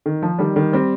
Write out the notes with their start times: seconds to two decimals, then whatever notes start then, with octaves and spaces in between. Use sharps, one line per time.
0.06 D#3
0.22 F3
0.39 D#3 G3
0.56 D#3 G3
0.73 G3 C4